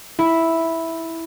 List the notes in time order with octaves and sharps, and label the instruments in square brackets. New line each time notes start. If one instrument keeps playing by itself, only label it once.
[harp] E4